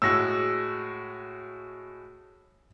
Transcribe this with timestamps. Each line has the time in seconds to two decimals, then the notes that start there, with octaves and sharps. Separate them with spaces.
0.02 A2 G#3 F#4 E6 A#6